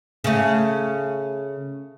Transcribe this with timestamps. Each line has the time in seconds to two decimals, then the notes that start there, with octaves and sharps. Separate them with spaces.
0.24 C#3 A3